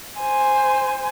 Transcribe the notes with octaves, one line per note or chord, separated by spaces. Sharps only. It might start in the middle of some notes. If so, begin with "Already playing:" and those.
C5 G#5